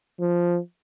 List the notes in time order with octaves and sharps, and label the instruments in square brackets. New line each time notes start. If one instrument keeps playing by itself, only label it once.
[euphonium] F3